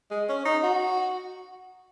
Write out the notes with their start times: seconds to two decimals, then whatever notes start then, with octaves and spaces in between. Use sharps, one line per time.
0.11 G#3
0.29 C#4
0.45 D#4
0.63 F#4